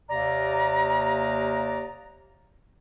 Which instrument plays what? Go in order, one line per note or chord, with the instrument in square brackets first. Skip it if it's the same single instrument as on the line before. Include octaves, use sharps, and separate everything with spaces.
[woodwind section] D#2 C3 A#3 D5 A#5